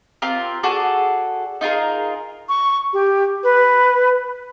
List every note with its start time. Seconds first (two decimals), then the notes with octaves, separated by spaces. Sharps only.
0.22 C4 F4 G4 A#4
0.63 F#4 G#4 A4 D5
1.61 D#4 F4 G#4 A#4
2.49 C#6
2.93 G4
3.43 B4